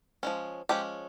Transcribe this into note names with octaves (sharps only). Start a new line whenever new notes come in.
F3 G#3 C#4
F3 G#3 C#4 G4